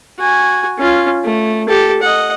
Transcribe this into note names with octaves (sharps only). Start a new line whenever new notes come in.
F#4 G#5
C#4 F4
A3
G4 A4
D#5 F#5